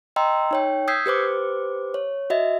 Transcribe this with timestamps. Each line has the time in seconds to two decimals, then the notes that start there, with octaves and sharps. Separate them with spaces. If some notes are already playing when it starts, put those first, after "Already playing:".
0.16 D#5 G5 A#5 C6 E6
0.51 D#4 C#5 G5
0.88 D#6 E6 G6 G#6 B6 C7
1.06 G4 B4 C5 D6
1.94 C#5
2.30 F#4 D#5 E5